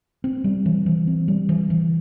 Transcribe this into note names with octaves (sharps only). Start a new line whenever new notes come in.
C4
G3
E3
E3
C4
G3
E3
E3